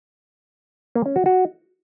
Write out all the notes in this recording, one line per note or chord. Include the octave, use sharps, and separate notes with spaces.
A#3
C#4
F#4
F#4